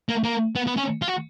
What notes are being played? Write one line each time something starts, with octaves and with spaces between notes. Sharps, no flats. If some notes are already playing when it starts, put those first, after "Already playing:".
A#3
A#3
B3
B3
C#4
F4
F#4